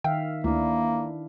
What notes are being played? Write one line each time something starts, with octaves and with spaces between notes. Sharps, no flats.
D#3 E5 F5 G5
D2 A#3 D4 E4